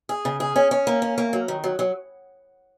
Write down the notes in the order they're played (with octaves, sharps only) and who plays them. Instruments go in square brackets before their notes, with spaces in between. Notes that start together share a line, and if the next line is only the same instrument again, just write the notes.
[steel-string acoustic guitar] G#4
C#3
G#4
C#4
C#4
A#3
C#4
A#3
F#3
D#3
F#3
F#3